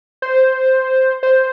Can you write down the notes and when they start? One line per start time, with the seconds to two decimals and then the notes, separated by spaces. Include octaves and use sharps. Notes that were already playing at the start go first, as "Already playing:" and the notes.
0.22 C5
1.23 C5